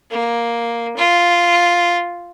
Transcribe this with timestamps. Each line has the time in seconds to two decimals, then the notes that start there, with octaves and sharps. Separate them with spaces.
0.11 A#3
0.97 F4